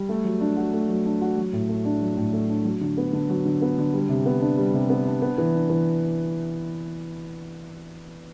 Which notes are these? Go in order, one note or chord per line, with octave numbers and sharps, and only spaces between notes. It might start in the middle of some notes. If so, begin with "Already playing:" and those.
Already playing: G3
A3
F#3
D4
F#4
A3
F#3
D4
F#4
F#3
A2
A3
D4
F#3
A2
A3
D4
F#3
D3
B3
D3
F#3
D3
B3
D3
G3
C3
B3
D4
G3
C3
B3
D4
B3
E3
D4
E3